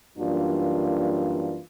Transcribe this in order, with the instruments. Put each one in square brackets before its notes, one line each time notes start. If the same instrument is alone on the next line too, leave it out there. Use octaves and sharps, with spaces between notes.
[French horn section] F#2 E3 G3 A#3 D4 F4